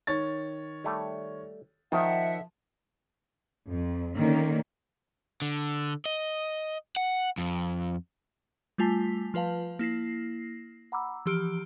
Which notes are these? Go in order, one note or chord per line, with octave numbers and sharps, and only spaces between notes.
D#3 C#5 A6
G3 A3
D#3 F3 E5 F#5
F2
D3 D#3 A#3 C#4
D3
D#5
F#5
F2
G3 A3 F4 G#5 A5 B6
F3 F4 B4 F5 A5
A#3 E4 A#6 C7
F#5 A#5 B5 D6 E6
E3 F3 G4 E6 F6 D7